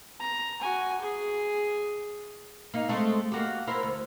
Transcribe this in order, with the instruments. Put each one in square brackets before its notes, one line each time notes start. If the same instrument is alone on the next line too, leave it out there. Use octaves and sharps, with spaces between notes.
[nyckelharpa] A#5
F#4 G#5
G#4
[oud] A#3 D#4
G#3 A3 C4
A#3 F#4 G4
E4 A#4 C5
D2